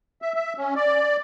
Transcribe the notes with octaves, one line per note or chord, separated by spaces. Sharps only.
E5
E5
C#4
D5